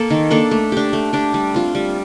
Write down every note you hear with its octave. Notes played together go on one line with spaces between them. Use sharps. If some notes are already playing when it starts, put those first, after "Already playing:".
Already playing: A#3 A4
D#3
A#3 D4 A4
A3
D4 G4
A3
D4 G4
G3
C4 F4
G3